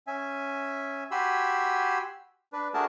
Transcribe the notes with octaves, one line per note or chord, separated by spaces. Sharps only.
C#4 E5 G#5
F#4 G4 G#5 B5 C6 E6
D4 B4
A3 D4 F#4 G#4 A#4 A5